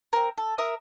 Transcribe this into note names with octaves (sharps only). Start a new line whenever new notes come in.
C4 A#4
A4
A#4 E5 D#6